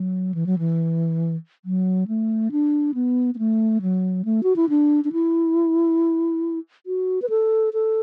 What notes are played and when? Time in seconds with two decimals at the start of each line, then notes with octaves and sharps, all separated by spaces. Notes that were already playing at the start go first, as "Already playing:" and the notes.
Already playing: F#3
0.34 E3
0.46 F#3
0.59 E3
1.65 F#3
2.08 A3
2.52 D4
2.94 B3
3.35 B3
3.39 A3
3.82 F#3
4.25 A3
4.43 F#4
4.56 E4
4.69 D4
5.04 D4
5.12 E4
6.86 F#4
7.22 B4
7.30 A4
7.73 A4